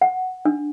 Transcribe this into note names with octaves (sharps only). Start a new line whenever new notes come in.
F#5
D4